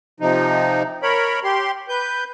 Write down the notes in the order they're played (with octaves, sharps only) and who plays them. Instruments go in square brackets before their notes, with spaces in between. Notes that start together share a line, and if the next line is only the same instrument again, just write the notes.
[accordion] C3 F3 D#4
A#4 C#5 B5
G4 C6
B4 G6